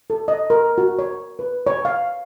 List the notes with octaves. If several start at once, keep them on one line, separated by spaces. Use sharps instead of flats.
A4
D#5
A#4
F#4
C#5
B4
C#5
F5